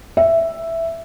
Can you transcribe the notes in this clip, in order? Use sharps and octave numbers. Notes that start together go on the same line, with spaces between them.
E5